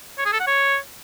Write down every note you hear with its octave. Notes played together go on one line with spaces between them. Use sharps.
C#5
G#4
A4
F#5
C#5